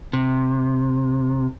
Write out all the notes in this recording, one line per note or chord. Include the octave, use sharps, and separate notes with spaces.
C3